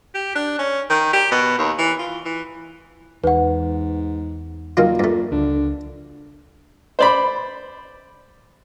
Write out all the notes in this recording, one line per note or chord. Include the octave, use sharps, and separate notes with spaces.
G4
D4
C#4
D#3
G4
B2
D#2
E3
F4
E3
E2 G#2 B4 F#5
A#2 D#3 F#3 F4
G2 A3
C#2 D3
C5 D5 B5